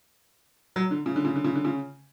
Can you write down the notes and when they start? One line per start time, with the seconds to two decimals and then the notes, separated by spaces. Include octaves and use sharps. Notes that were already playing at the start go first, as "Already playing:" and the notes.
0.76 F#3
0.91 D3
1.06 C#3
1.16 D3
1.25 C#3
1.36 D3
1.44 C#3
1.55 D3
1.65 C#3